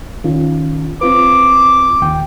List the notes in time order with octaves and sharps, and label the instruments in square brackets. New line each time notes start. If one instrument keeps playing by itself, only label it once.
[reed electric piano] D#3 C#4 F4
[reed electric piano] C4 F4 B4 [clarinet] D6
[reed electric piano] D#2 G5